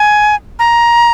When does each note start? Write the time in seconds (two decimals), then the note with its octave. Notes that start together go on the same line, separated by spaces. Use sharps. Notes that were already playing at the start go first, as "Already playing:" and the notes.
Already playing: G#5
0.59 A#5